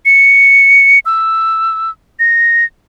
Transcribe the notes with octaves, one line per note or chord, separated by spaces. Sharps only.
C#7
E6
A#6